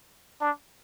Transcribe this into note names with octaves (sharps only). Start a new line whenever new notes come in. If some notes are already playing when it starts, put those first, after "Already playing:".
D4